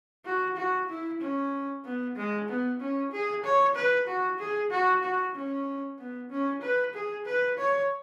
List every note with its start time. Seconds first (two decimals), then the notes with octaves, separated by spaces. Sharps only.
0.26 F#4
0.57 F#4
0.89 E4
1.21 C#4
1.85 B3
2.16 G#3
2.49 B3
2.81 C#4
3.12 G#4
3.44 C#5
3.75 B4
4.07 F#4
4.39 G#4
4.71 F#4
5.03 F#4
5.35 C#4
5.98 B3
6.30 C#4
6.62 B4
6.94 G#4
7.26 B4
7.58 C#5